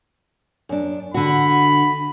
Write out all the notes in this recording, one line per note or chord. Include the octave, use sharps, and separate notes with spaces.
F#2 D4
D3 F#4 B5